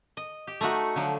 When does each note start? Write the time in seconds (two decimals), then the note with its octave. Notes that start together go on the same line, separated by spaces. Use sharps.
0.17 D#5
0.47 G4
0.61 A3 D#4 F#4
0.96 D3 F3 F#3